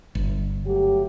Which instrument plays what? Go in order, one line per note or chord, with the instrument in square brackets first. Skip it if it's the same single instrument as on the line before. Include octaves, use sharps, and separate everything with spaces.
[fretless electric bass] G1
[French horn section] F#3 A3 G4